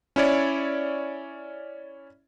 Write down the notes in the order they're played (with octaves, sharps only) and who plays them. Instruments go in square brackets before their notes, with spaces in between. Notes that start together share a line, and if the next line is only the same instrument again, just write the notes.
[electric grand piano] C#4 E4 C#5 D5